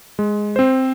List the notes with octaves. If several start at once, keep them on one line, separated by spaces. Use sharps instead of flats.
G#3
C4 C5